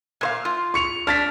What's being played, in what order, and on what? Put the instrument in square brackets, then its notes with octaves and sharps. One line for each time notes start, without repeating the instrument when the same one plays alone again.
[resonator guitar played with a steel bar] A#2 C5 F5
F4
[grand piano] C#6 C#7 F7
[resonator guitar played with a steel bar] D4 [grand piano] F6 A6 B6